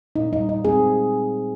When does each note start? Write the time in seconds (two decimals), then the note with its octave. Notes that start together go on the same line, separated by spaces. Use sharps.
0.16 A#2 D#4
0.32 G3 D#4
0.49 D#4
0.65 C4 G#4